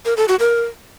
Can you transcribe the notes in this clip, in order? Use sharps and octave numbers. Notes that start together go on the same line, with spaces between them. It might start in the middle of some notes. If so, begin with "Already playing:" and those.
A#4
A4
F#4
A#4